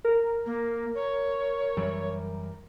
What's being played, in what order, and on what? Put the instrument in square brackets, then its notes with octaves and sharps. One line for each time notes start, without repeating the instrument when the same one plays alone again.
[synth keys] A#4
[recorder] A#3
C#5
[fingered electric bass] F#2 E3 G3